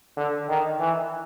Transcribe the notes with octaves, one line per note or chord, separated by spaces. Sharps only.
D3
D#3
E3